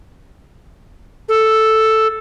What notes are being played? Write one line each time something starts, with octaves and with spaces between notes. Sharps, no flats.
A4